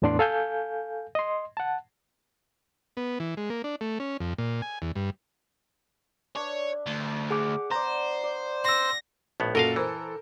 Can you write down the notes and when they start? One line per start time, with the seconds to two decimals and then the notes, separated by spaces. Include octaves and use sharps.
0.02 E2 A2 B3 D4 D5 C6
0.19 A4 F5 G#5 G6
1.15 D#5 C6
1.57 F#5 A5
2.97 B3
3.20 E3
3.37 G#3
3.50 A#3
3.64 D4
3.81 A3
4.00 C#4
4.21 F2
4.38 A#2
4.62 G#5
4.82 E2
4.96 G2
6.35 D4 B4 C#5 E5
6.86 D2
7.31 G#4 F#5 D6
7.71 B3 C5 D5 A#5
8.23 D5
8.65 C6 E6 A#6
9.40 A#1 A2 B3
9.55 F#2 A#2 F#4 A4 A#4 D#5 F5
9.76 E3 A#4 C5